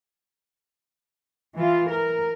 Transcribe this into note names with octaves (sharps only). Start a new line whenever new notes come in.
E3 F4
A#4